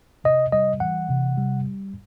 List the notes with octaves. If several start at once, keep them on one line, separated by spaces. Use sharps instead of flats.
C3 D#5
G3 D#5
E3 F#5
C3
G3